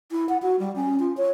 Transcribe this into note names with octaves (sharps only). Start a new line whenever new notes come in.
E4
F#5
F#4
G3
C#4
F4
C#5